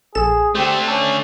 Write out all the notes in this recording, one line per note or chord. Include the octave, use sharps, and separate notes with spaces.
A#1 G#4 A4 E7
D3 A3 C4 G4
C#4 A4 G5